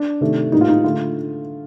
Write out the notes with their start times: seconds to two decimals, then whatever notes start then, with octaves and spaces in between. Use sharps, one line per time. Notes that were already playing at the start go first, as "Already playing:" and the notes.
Already playing: D4
0.21 C3 D#3 A3
0.52 A2 G3 A#3 D#4
0.61 F4
0.68 D#4
0.84 D3 A3 F4